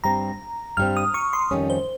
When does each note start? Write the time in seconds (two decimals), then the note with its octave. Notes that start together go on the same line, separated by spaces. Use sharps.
0.04 G2 G3 C4 A#5
0.77 G2 G3 C4 F6
0.97 D#6
1.14 C#6
1.33 C6
1.51 F2 D#3 G3 C#4
1.70 C5